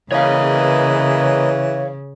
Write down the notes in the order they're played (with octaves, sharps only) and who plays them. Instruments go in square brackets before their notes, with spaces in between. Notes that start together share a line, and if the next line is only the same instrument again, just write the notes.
[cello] C#3 [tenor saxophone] E3 [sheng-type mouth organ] A#3 B4 D#5 [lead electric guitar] C#5 F5